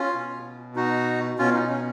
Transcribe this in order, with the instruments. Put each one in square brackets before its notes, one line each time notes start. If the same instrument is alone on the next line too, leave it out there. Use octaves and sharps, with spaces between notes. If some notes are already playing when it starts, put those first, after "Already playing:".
Already playing: [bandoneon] C#4 F4
B2
D#4 F#4
B2 C#4 F4
D#4
C#4